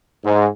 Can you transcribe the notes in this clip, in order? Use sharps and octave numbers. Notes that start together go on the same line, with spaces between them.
G#2